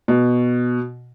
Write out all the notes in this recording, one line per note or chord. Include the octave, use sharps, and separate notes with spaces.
B2